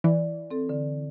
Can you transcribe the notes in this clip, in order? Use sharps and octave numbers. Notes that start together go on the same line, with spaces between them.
E3 D5
C4 A4
D3